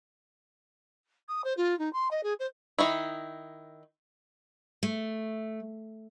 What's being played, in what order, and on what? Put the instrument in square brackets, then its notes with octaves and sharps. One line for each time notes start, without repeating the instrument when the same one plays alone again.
[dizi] D#6
C5
F4
D#4
C6
D#5
G#4
C5
[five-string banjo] D#3 D#4 E4
[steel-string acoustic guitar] A3